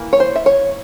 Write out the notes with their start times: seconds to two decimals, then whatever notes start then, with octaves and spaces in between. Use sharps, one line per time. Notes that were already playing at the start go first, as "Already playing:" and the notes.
Already playing: E3 A#3
0.13 C#5
0.20 C5
0.36 E5
0.46 C#5